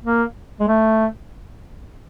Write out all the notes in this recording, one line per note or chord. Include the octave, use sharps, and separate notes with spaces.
A#3
G#3
A3